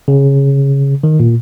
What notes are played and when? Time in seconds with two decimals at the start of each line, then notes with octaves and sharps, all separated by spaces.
0.08 C#3
1.04 D#3
1.20 A#2